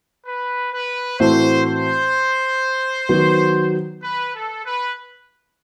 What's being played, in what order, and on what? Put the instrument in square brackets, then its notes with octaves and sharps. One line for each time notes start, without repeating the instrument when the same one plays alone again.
[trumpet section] B4
B4
[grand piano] A2 E3 A3 C4 F#4 [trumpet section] C5
[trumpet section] C5
[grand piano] D#3 F#3 B3 F#4
[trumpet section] B4
A4
B4